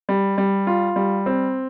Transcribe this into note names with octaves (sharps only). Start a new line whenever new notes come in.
G3
G3
F4
G3
C4